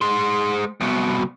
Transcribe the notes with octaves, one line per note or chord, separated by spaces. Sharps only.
G#3 C5
C2 B2